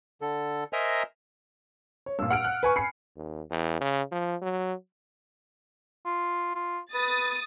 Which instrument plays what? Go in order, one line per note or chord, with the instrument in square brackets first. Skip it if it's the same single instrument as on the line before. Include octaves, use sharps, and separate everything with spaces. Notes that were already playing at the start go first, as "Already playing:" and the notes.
[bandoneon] D3 A4
A#4 C5 D#5 E5 G#5 A#5
[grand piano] C#5
[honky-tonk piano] G2 A#2 [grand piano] E6
[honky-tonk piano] F#5 F6 D7
[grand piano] F#6
B4 G#5 C#6
[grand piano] G#5 B5 [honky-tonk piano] C7 C#7
[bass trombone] D#2
E2
C#3
F3
F#3
[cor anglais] F4
F4
[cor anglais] B4 [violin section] D#6 A6